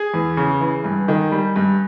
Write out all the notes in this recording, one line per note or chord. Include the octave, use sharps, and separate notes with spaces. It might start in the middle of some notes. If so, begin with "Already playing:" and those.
Already playing: G#4 G#5
E2
C#3
E3
G2
D#3
G3
G2